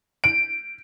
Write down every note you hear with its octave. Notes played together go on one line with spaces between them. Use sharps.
D7